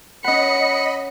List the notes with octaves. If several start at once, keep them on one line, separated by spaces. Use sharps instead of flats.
C#4 D#5 F#5 B5 C#7